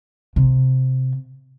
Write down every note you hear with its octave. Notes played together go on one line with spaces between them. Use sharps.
C3